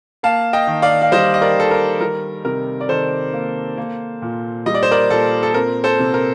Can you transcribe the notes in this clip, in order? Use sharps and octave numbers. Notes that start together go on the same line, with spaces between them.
A#3 F5 A5
D#5 G5
D#3
D5 F5
F5
G3 C5 D#5
D#5
A#4 D5
D#3 A4
A#4
G3 A#4
C3 A#4
D5
D#3 A4 C5
A#3
A#3
A#2
G3 D#5
D5
C5
A#4 D5
A#2 A4
A4
C4 A#4
A4 C5
C3
A#4